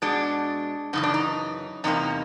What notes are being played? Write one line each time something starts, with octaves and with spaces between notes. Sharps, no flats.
B2 G#3 D4
F#2 C#3 E3 D#4
D4
D#4
E2 C3 G3 A#3 D#4